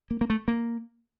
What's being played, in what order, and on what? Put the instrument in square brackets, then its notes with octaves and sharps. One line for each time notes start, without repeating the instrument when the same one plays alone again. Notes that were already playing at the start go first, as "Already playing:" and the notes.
[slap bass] A#3
A#3
A3
A#3